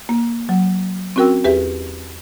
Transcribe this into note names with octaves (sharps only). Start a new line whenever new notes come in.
A#3
F#3
C4 C#4 F#4 A#4 G5 E6
E2 G4 G#4 B4 E5